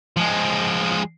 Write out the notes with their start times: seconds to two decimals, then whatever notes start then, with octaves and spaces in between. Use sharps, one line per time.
0.17 F3 G#3